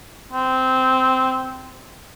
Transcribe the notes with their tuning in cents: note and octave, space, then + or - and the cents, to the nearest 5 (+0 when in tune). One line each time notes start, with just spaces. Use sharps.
C4 -10